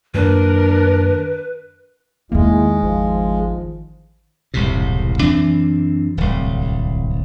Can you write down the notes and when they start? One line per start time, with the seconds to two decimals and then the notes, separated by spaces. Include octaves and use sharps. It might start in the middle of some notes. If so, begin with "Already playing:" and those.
0.14 F#2 D#3 A#3 D4 A#4 B4
2.32 E2 D#3 G#3 A#3 E4
2.83 G#1 F3
4.54 E1 C2 A2 C3
5.20 F#2 E3 C4 D4
6.17 D1 C2